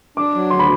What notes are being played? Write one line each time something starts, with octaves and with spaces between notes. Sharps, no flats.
D4 D6
F#3
D2 C6
B5